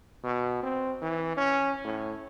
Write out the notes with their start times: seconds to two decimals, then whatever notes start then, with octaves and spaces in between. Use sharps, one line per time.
0.24 B2
0.63 C4
1.02 E3
1.37 C#4
1.84 A2